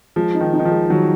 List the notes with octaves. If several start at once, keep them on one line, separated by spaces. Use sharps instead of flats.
F3 G#3
D#4
D#3
D#4
D#3
F3
G#3
D#3 F#3